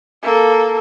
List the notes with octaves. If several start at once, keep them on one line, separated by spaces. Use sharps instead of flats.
A#3 A4